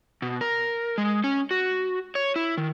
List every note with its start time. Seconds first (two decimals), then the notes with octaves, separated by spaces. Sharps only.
0.22 B2
0.41 A#4
0.98 G#3
1.24 C#4
1.51 F#4
2.15 C#5
2.36 E4
2.57 D#3